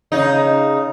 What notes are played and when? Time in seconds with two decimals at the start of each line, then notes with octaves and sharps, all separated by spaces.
0.12 C#3 D#4